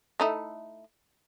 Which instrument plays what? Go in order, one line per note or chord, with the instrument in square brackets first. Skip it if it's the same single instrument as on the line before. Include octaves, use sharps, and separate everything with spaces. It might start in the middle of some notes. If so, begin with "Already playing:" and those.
[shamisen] A3 D#4 E4